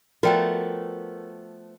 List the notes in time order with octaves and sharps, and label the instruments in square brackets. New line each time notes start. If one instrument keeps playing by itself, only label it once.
[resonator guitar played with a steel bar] F3 A3 B3 [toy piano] F#4 D5 G5 [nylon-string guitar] A#4